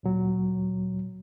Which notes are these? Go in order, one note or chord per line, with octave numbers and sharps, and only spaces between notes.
D2 A#2 F#3